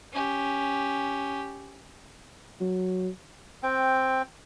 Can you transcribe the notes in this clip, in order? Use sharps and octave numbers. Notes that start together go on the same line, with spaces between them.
C#4 G4
F#3
C4 G5